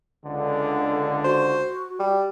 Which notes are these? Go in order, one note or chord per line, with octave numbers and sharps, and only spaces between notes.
C#2 D3
F#4 C5
G3